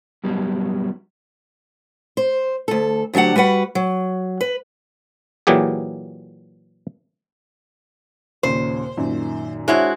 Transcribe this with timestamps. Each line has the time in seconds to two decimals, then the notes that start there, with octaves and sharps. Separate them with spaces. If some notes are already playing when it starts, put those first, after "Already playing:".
0.24 G2 B2 F#3 G3
2.17 C5
2.68 D2 A4
3.13 D2 F#3 D4 G4 F#5
3.36 G3 F#4 B4 F#5
3.75 F#3
4.41 B4
5.47 A#2 E3 F#3 G4 G#4
8.43 D#2 A#2 C#3 C5
8.97 F#2 A#2 D#3
9.68 G#3 D4 E4 F#4 C5 C#5